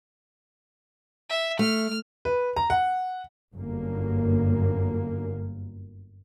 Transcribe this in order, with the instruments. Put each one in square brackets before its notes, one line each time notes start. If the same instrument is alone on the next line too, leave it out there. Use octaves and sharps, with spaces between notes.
[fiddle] E5
[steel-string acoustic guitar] A3 [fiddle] F6
[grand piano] B4
A#5
F#5
[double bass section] G1 F#2 A#3